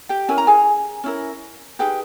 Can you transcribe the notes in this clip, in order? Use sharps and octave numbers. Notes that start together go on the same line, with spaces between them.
G4 G5
C#4 E4 A#4 G#5
A#5
G#4 G#5
C#4 E4 A#4
D#4 G4 G#4 B4 G5